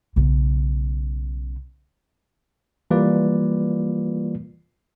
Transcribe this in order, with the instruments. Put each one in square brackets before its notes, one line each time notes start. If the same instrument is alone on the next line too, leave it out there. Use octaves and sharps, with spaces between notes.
[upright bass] B1 C#3
[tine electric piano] E3 G3 A#3 F4 B4 D5